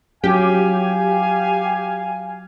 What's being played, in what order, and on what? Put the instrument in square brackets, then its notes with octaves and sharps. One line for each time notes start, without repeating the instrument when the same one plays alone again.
[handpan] F#3 C#4 F4 [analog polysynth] G4 [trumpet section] F5 G#5